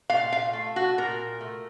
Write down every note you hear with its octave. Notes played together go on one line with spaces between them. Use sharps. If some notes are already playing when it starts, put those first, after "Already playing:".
A#2 F5
F5
A3
F#4
A#2 A#4
A3